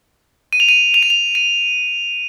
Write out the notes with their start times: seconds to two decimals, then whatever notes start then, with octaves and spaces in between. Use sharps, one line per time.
0.53 D#7
0.60 F7
0.69 D#7
0.94 F7
1.03 D#7
1.10 F7
1.35 D#7